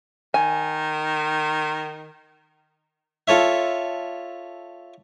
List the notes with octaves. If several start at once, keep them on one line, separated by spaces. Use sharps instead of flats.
D#3 G#5
F4 A4 C#5 E5